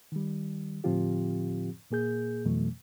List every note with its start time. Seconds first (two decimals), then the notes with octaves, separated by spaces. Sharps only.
0.12 D#3 G3
0.84 A2 D3 F3 C4 F4 G4
1.91 A#2 A#3 G#4 G6
2.45 F2 B2 E3 F#3 A3